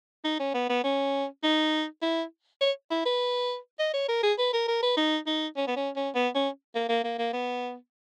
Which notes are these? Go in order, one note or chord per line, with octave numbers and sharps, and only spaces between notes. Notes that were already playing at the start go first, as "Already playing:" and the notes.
D#4
C#4
B3
B3
C#4
D#4
E4
C#5
E4
B4
D#5
C#5
A#4
G#4
B4
A#4
A#4
B4
D#4
D#4
C#4
B3
C#4
C#4
B3
C#4
A#3
A#3
A#3
A#3
B3